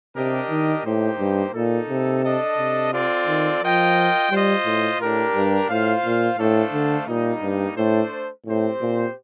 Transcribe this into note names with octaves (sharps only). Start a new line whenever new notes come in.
C3 D4 G4 A#4 D#5
D#3
A2 A#3 D#4 G4 C5
G2
A#2 A#3 D#4 A4
C3
D4 A4 D#5
C3
C4 F4 A4 D5
D#3
F3 F4 A#4 D#5 G5
G3 F4 C5 D#5
A2
A2 D4 G4 A#4
G2
A2 F4 C5 F5
A#2
A2 A3 D4 A4 C5 F5
D3
A#2 G3 A#3 D#4
G2
A2 A3 D4 A4 C5
A2 C4 G4 C5
A#2